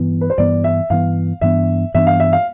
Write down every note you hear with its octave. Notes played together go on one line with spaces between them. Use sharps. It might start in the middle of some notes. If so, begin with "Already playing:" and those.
Already playing: G2 E3 B3
B4
C5
G2 E3 B3 D5
E5
G2 E3 B3 F5
G2 E3 B3 D4 E5
G2 E3 B3 D4 E5
F5
E5
F5